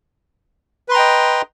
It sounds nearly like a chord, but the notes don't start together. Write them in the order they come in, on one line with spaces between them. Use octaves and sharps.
B4 C6 A#5 G5 D#5